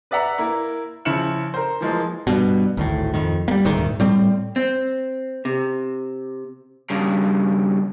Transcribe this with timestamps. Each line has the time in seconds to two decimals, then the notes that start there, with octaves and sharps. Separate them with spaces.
0.11 B4 D5 E5 F#5 A#5
0.38 A#3 E4 A#4
1.05 C#3 F3 E4 C#7 E7 F#7
1.54 A#4 C5
1.81 E3 F3 G#3 A#3
2.27 G2 B2
2.77 G#1 D2 A2
3.14 F2 D#3
3.48 G3 A#3
3.65 D#1 D2 G#2 D#3
4.00 A2 G3 C4
4.56 C4
5.45 C3
6.90 G2 C#3